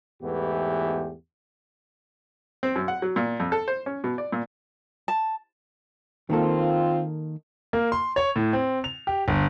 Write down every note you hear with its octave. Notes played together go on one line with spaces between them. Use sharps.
E2 G#2 E3 A3 B3 G4
C4
F#2
F#5
F#3
A#2
F2
A4
C5
C#4
B2
D5
A#2
A5
D#3 A#3 C4 F4 A4
A#3
C6
C#5
A2
C4
F7
G4
G1